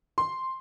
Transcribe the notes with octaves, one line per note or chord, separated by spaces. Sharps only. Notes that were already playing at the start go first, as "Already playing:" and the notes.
C6